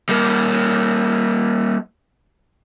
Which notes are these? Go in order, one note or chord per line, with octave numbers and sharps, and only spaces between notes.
G3 A#3